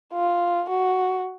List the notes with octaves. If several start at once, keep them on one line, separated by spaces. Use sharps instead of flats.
F4
F#4